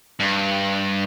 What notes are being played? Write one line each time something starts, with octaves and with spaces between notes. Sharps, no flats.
G2